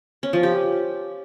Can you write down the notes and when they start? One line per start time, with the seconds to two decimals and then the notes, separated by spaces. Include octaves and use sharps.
0.23 C#4
0.33 F3
0.43 G4